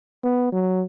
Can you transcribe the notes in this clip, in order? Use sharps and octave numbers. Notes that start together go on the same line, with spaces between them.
B3
F#3